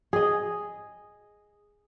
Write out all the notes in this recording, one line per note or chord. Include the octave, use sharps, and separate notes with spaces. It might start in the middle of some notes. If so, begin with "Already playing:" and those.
G#4 D#5